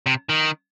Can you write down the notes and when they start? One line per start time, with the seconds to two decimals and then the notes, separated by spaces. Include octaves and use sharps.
0.06 C3
0.29 D#3